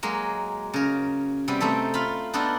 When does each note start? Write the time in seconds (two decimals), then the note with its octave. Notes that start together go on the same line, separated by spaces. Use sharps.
0.03 F#3 G#3 A#3
0.74 C#3 A#4
1.48 C3 G3 B3
1.61 A3 C4 D#4 A4
1.94 F4 F5 B5
2.34 B3 D4 D#4 F4 A4